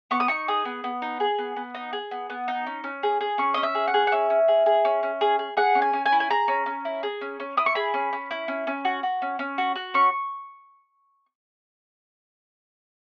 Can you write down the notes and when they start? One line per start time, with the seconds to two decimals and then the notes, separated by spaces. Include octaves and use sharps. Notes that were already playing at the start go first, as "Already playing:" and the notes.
0.11 B3 C#6
0.20 D#6
0.28 D#4 C#6
0.48 G#4 D#6
0.65 B3
0.84 B3
1.02 D#4
1.20 G#4
1.39 B3
1.56 B3
1.75 D#4
1.93 G#4
2.11 B3
2.30 B3
2.48 D#4
2.67 C#4
2.84 C#4
3.03 G#4
3.21 G#4
3.38 C#4 C#6
3.54 C#4 D#5
3.63 E5
3.75 G#4
3.88 F#5
3.94 G#4
4.07 F#5
4.12 C#4 E5
4.30 C#4
4.48 G#4
4.66 G#4
4.85 C#4
5.03 C#4
5.21 G#4
5.39 G#4
5.57 G#4 F#5
5.75 C#4
5.82 G#5
5.93 C#4
6.06 G#5
6.12 E4
6.20 G#5
6.30 G#4 A#5
6.48 C#4
6.66 C#4
6.85 E4
7.03 G#4
7.21 C#4
7.40 C#4
7.57 E4 D#6
7.66 C#6
7.75 G#4 B5
7.94 C#4
8.13 C#4
8.31 E4
8.48 C#4
8.67 C#4
8.85 F#4
9.03 F#4
9.22 C#4
9.39 C#4
9.58 F#4
9.76 F#4
9.94 C#4 C#6